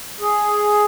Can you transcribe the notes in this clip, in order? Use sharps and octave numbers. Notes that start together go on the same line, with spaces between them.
G#4